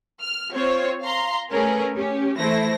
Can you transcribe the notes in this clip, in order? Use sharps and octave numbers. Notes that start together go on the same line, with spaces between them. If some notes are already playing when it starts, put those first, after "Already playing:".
F6
C4 F4 C5 C#5
F5 A#5 C6
A3 C#4 G#4 A#4 B4
C#4 G4
E3 A3 E4 C5 A#6